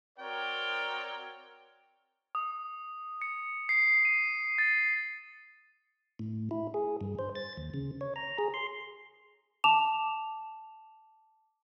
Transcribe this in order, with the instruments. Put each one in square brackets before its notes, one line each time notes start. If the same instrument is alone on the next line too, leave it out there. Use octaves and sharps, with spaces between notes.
[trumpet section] C4 F#4 A#4 C#5 D5 G5
[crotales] D#6
C#7
C7
D#7
A6
[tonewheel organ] A2
E4
G#4
G2
C5
A6
D#2
C#3
C#5
A#5
G#4
C6
[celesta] A5 D6 E7 F7